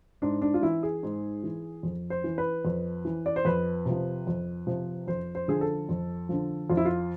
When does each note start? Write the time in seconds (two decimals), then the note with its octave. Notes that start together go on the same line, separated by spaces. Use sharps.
0.22 G#2 D4
0.42 D4
0.54 F4
0.62 E3 E4
0.83 G#4
1.03 G#2
1.43 E3
1.83 F2
2.10 C5
2.24 E3
2.38 B4
2.65 F2
3.05 E3
3.26 D5
3.36 C5
3.45 F2 B4
3.86 C3 F3
4.27 F2
4.67 C3 F3
5.07 F2 C5
5.35 C5
5.48 D3 F3 G#4
5.61 A4
5.89 F2
6.29 D3 F3
6.69 F2 F4
6.77 E4
6.85 F4